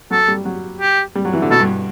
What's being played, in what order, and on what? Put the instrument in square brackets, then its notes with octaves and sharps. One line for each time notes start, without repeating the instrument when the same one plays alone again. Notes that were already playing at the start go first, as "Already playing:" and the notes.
[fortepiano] F#3 [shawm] A4
[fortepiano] G3
F#3
[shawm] G4
[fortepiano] G3
F#3
E3
D3
[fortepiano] B2 [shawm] A4
[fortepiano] G2